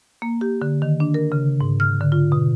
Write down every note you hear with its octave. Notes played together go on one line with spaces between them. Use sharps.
A#3
G4
D3
D#3
D4
A#4
C#3
G#2
F6
D3
F4
B2